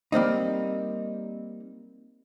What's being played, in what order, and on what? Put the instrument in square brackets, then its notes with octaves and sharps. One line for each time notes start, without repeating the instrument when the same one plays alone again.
[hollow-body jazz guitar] G3 A#3 C4 D#4